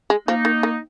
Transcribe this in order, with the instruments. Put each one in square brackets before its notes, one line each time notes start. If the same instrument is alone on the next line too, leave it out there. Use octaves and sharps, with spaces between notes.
[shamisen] G#3
[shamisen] F3 [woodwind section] A#3 D#4
[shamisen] D#3
D#3